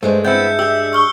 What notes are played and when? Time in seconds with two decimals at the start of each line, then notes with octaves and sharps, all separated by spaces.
0.03 G2 G#3 A3 D4 C5
0.25 B3 C4 E4 E5 G6 C#7
0.59 G4 E6 G6
0.93 C#6 E6 F6 G7